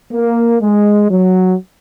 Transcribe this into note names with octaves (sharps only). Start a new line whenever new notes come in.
A#3
G#3
F#3